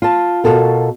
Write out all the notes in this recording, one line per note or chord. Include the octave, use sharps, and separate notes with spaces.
F4 A5
B2 F4 F#4 A4 A#4